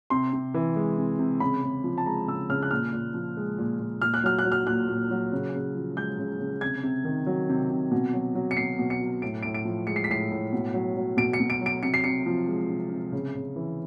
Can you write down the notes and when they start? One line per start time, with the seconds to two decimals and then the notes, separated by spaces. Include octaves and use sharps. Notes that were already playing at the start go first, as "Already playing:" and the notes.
0.10 C3 C6
0.33 C3
0.54 E3
0.76 G#3
0.98 C3
1.19 C3
1.40 C#3 B5
1.63 C#3
1.84 F3
1.98 A5
2.06 G#3 A#5
2.28 C#3 E6
2.49 C#3 F6
2.63 F#6
2.71 A#2 F6
2.92 A#2
3.14 F3
3.37 G#3
3.58 A#2
3.79 A#2
4.01 A#2 F6
4.14 F#6
4.24 F#3 F6
4.39 F#6
4.44 F#3
4.52 F6
4.67 A#2 F#6
4.89 A#2
5.11 F#3
5.32 C#3
5.54 C#3
5.75 F3
5.96 G#3 G6
6.19 C#3
6.40 C#3
6.61 C3 G#6
6.83 C3
7.05 D#3
7.26 F#3
7.49 C3
7.70 C3
7.91 B2
8.14 F#3
8.35 F#3
8.51 C#7
8.57 B2 C7
8.79 B2
8.90 C#7
9.01 F#3
9.22 A2 D7
9.43 A2 D7
9.54 D7
9.65 F3
9.87 G#3 C#7
9.96 C7
10.04 B6
10.10 A2 C7
10.31 A2
10.53 B2
10.74 F#3
10.96 F#3
11.17 B2 D7
11.33 C#7
11.40 B2
11.50 D7
11.61 F#3
11.66 D7
11.83 C3 C#7
11.94 C7
12.04 C3 C#7
12.26 F3
12.48 G#3
12.70 C3
12.91 C3
13.12 C#3
13.35 C#3
13.56 E3